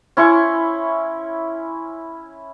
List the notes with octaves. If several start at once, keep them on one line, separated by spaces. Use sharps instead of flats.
C#4 E4 C6 C#6